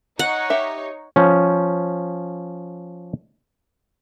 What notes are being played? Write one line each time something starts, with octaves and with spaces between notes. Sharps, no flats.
D#4 C#5 F#5
G4 E5
F3 C#4